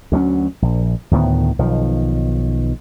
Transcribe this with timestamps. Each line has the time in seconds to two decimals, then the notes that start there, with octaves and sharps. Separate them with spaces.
0.12 D2 F#3 G3 C#4
0.62 A#1
1.11 D2 A2 D#3 B3
1.59 B1 D#3 F3